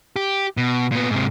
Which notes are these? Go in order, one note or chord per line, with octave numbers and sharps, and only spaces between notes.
G4
B2
A#2 B3
G#2 C3